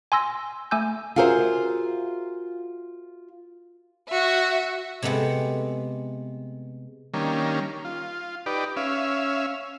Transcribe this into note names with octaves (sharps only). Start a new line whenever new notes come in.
G#5 C6 E6 A#6
A3 G#5 E6 G6
F4 F#4 G#4 A#4 C5 E5
F#4 E5
C3 G#3 A3 B3 C4
D#3 G3 A#3 C#4 D4
F4
D#4 G4 B4 D5
C#4 E5 F5